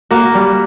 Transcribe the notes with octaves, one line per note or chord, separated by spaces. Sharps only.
A#3 F#4
G3